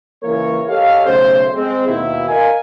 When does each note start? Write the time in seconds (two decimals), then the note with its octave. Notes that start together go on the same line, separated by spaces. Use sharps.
0.23 C#2 E3 A#3 A#4 C#5
0.69 G4 A4 C#5 D#5 F5
1.05 B1 C#3 A3 C5
1.55 G#3 C4
1.87 D#2 B2 E4
2.28 A#4 D#5 F5 G#5